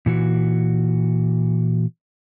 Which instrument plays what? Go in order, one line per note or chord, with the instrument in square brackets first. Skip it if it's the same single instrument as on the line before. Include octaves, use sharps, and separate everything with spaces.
[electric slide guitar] A#2 E3 F#4